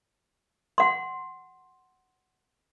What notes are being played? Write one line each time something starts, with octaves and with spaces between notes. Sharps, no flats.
F#5 C6